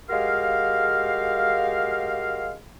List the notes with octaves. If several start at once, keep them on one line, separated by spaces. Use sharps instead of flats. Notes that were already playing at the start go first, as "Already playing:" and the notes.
G#3 F#4 G4 A#4 F5